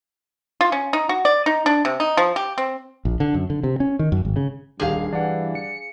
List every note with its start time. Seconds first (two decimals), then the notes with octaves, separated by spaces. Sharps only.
0.61 F4
0.72 C#4
0.93 D#4
1.09 F#4
1.25 D5
1.46 D#4
1.66 D4
1.85 C3
2.00 D#4
2.17 F3
2.36 G4
2.58 C4
3.05 A#1
3.20 D3
3.34 F#2
3.50 D3
3.63 C3
3.80 C#4
3.99 D#3
4.12 F#2
4.25 G#1
4.36 C#3
4.80 D#1 G2 D#3 G4 G#4 F5
5.13 E3 D4 F#5
5.55 C#7